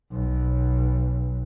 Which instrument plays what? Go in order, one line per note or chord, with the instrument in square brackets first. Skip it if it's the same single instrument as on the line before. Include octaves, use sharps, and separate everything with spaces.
[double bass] B1